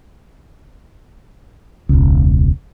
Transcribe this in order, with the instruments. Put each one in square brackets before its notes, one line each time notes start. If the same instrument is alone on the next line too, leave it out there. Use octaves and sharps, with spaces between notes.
[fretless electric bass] E1 C#2